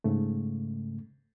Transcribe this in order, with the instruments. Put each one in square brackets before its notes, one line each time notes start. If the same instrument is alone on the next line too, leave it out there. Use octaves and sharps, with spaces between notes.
[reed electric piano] G#2 C#3 A3